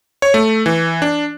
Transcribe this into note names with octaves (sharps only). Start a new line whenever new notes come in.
C#5
A3
E3
D4